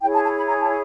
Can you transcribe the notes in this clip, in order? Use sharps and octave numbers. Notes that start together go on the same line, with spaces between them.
E4 G#4 C#5 G5
A5
A5
B5
A#5
A5